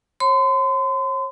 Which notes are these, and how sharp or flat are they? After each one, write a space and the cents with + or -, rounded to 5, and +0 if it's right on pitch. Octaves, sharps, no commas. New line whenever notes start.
C#5 -40 C6 -40